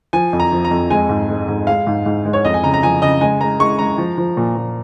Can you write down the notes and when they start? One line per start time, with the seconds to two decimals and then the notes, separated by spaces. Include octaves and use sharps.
0.13 F3 G#5
0.33 F2
0.40 A#5
0.52 F3
0.65 A#5
0.71 F2
0.90 G#3 G#5
1.09 G#2
1.29 G#3
1.48 G#2
1.67 G#3 F5
1.87 G#2
2.06 G#2
2.25 G#3
2.33 C#5
2.45 F2 D#5
2.54 G#5
2.63 C#3 A#5
2.74 A#5
2.83 F3 G#5
3.02 C#3 D#5
3.21 G#3 G#5
3.41 G#3 A#5
3.60 G#3 C#6
3.79 G#3 A#5
3.98 F3
4.18 F3
4.37 A#2
4.56 A#2